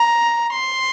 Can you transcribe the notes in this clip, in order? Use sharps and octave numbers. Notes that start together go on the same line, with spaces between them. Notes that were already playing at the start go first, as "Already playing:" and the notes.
Already playing: A#5
C6